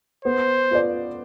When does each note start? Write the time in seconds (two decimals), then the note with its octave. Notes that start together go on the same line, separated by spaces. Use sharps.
0.25 B3 C5
0.71 F4 B4 D5